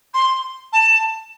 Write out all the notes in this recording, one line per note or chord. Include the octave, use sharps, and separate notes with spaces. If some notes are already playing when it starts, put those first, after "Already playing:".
C6
A5